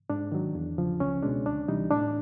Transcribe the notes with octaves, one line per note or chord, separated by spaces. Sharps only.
G#2 D4
D#3 F#3
E2
C#3 F3
C#2 C#4
B2 G#3 D4
D2 D4
C3 E3 G3 D#4
A2 D4